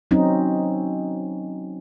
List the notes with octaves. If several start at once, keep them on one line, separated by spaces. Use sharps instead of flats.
F#3 C4 C#4 D#4